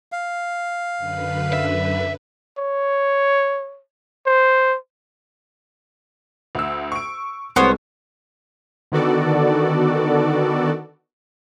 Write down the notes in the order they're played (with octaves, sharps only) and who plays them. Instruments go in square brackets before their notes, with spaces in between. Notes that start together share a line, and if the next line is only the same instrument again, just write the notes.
[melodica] F5
[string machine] F#2 D3 B4
[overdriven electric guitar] E5
[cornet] C#5
C5
[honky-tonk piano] D2 E6
C#6 D7
[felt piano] C2 G#3 [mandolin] B3 C5 C#5
[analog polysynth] D3 D#3 B3 F#4 A4 D5